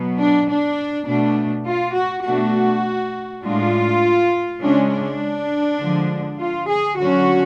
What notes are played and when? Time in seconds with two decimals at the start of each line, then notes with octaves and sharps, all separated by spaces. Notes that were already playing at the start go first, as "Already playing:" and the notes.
Already playing: B2 F#3 B3
0.19 D4
0.48 D4
1.08 B2 A3 D4
1.67 F4
1.96 F#4
2.26 B2 A3 D4 F#4
3.44 A2 G#3 D4 F4
4.62 C#3 G#3 C#4 D4
4.91 D4
5.80 D3 F3 G#3
6.39 F4
6.68 G#4
6.98 D3 F#3 C#4 F#4